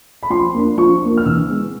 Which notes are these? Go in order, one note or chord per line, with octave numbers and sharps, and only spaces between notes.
B5
F3 C6
A#3 D4
F3 C#6
A#3 D4
F6
E3 E6
G#3 B3